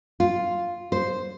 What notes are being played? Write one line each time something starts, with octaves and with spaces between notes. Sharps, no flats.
F4
C5